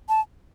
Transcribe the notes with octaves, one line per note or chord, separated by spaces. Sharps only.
A5